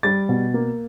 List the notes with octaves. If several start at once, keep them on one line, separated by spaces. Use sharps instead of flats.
G3 A6
B2
A#3